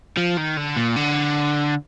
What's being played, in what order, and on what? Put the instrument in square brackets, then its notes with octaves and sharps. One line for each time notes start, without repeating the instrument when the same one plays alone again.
[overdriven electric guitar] F3
D#3
D3
A#2
D3